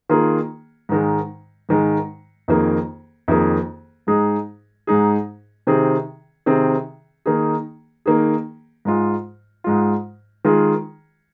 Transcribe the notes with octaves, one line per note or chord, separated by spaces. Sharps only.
D#3 A#3 F4 G#4
G#2 D#3 G#3
G#2 D#3 G#3
F2 D#3 A#3 G#4
F2 D#3 A#3 G#4
G#2 G#3 D#4 G#4
G#2 G#3 D#4 G#4
C3 D#3 C4 G#4
C3 D#3 C4 G#4
D#3 A#3 D#4 G#4
D#3 A#3 D#4 G#4
G#2 G#3 F4
G#2 G#3 F4
D#3 G#3 F4 G#4